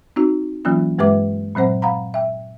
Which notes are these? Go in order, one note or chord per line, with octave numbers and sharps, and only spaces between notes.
C4 D#4 F#4
E3 F#3 A#3 C#4 F4
G2 G#3 G4 B4 E5 D6
A#2 F#3 C4 C5 F#5
F5 F#5 A#5 B5
E5 G5